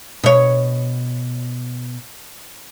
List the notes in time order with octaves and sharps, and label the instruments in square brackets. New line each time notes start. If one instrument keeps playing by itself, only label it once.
[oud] B2 C#5